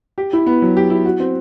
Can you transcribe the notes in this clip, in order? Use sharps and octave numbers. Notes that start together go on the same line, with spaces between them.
G4
E4
B3
F#3
G4
E4
F#4
C4